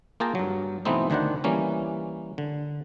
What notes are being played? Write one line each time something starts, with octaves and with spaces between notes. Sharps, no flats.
A#3 F4 G#4 G5 A5 A#5
G2 F#3
B2 E3 A3 B3 C4 D#4
D2 D#3 D4 C5 D5 F#5
E3 G3 A#3 C#4
D3